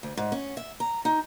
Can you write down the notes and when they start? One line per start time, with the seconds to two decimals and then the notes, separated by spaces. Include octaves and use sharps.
0.03 D2
0.17 G#2
0.32 C#4
0.57 E5
0.80 A#5
1.05 D#4